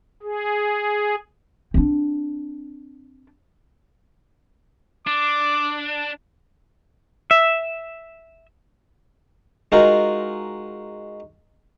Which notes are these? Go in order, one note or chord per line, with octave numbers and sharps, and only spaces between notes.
G#4
C4 D4
D4 D6
E5
G#3 D#4 F4 F#4 A#4